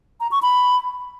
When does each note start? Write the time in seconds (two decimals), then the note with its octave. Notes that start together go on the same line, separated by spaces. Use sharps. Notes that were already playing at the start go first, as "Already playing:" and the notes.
0.20 A#5
0.31 C#6
0.42 B5